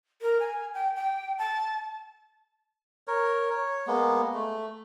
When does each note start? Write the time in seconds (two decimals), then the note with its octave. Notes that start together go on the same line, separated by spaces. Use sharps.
0.22 A#4
0.40 G#5
0.74 G5
0.96 G5
1.38 A5
3.07 A#4 C#5
3.50 C#5
3.87 G#3 A#3 B3
4.34 A3